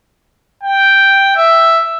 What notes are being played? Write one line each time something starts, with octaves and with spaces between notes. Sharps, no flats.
G5
E5